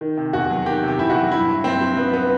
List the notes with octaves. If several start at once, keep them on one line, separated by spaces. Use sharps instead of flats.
D#3
C3
E2 F#4
F#3
D#3 G4
C3
G4
E2 E4
F#4
F#3
G2 E4
F#3
G2 C4
F#3
G2 B3
F#3 B3